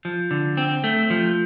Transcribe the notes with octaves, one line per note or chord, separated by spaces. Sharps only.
F3
D3
C4
A3
F3